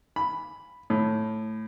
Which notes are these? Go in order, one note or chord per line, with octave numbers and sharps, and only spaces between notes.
B5
A2